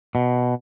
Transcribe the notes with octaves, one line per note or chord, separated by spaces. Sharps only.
B2